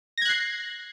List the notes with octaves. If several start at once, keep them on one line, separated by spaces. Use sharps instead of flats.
F#6 G#6 A#6 C7